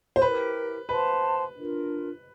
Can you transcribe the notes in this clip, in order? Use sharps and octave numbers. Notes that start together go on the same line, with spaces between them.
C5
E4 G4 A#4 B4
B4 C5 F5 A5 C6
D4 F4 A#4